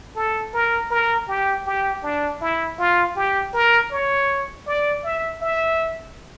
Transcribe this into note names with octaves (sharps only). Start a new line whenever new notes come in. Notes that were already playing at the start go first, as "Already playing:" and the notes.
A4
A#4
A#4
G4
G4
D4
E4
F4
G4
A#4
C#5
D5
E5
E5